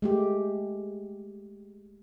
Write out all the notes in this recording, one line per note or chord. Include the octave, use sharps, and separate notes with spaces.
G#3 A3 G4